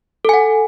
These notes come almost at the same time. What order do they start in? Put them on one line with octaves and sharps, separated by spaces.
A4 G#5 F#5